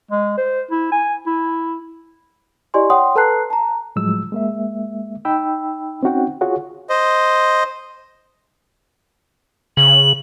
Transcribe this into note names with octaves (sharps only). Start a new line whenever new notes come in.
G#3
C5
E4
G#5
E4
E4 G4 D5 D#5 G#5 C6
C#5 F#5 G5 C6 D#6
A4 B4 A5 A#5 F#6 C7
A5 A#5
A2 F3 F#3 G#3 E6
G#3 A#3 E5
D#4 G5 B5 E6
C4 C#4 D#4 F#4 F#5 G5
F4 F#4 G#4 C#5 F#5
C5 D#5
C#3 F#7